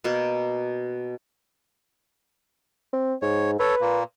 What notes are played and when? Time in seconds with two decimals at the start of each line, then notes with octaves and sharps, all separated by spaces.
0.04 B2 A#3 F#4
2.93 C4
3.22 G#2 C#5
3.59 A4 B4 C#5
3.81 A#2 A#3